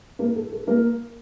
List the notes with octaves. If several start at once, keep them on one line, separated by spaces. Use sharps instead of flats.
A#3 A#4
A4
A4
A#3 A#4